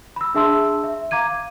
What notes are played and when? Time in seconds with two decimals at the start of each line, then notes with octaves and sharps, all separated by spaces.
0.16 B5 E6
0.35 D4 G#4 E5 A5 C6 E6
0.84 E5
1.11 F5 A#5 D6 G#6 D#7